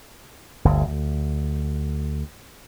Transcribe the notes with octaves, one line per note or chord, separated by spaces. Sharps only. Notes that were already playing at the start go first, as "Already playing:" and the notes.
G1 D2
D2